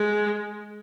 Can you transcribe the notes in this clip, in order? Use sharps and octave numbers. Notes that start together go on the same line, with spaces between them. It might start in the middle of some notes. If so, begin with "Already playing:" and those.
Already playing: G#3